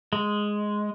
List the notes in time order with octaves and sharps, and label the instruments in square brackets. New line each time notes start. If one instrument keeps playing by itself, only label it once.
[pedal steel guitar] G#3